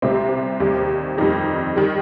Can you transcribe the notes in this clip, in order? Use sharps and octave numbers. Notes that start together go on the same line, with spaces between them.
C2 C3 G3 C4
D#2 D#3 G3
F2 D#3 G3 D#4 G4
D#3 G3